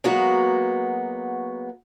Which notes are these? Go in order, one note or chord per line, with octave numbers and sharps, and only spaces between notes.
F#3 G#3 A#3 B3 F#4